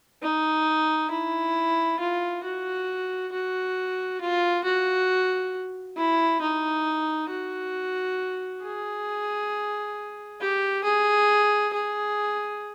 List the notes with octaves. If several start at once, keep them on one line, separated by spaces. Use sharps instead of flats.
D#4
E4
F4
F#4
F#4
F4
F#4
E4
D#4
F#4
G#4
G4
G#4
G#4